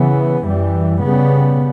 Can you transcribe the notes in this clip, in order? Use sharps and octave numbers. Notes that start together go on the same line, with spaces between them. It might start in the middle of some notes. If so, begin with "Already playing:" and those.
Already playing: C#3 E3 B3
F#2 E3 G3
C#3 G3 B3